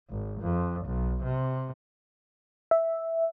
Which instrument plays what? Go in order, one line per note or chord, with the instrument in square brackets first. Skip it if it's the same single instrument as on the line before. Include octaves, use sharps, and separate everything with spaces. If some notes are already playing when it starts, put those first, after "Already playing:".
[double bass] G#1
F2
B1
C3
[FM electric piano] E5